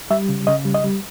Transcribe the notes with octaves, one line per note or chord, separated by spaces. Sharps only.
G3 E5
C#3
C#3 D#5
G3
D#5
G3